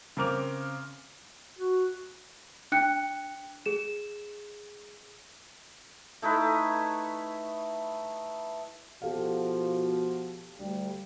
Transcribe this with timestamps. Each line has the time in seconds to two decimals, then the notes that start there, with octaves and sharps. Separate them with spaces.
0.17 C#3 C4 A#4 D6 F7
1.59 F#4
2.72 D4 G5 F#6 C#7
3.66 G#4 E7
6.22 A3 D#4 E4 B4
9.02 B2 F3 F#4 G4 A4 F5
10.59 D2 G3